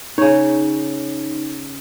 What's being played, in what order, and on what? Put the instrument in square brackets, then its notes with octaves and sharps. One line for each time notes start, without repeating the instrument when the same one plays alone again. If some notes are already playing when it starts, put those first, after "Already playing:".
[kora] C#3 C#5 [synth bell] D#4